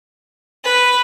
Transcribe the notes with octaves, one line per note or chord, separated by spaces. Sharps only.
B4